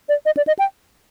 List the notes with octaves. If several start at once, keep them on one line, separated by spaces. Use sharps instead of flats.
D5
D#5
D5
D#5
G5